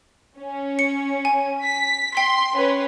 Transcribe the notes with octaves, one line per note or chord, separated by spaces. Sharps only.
C#4
C#7
G#5
B6
G5 C6 B6
C#4 B4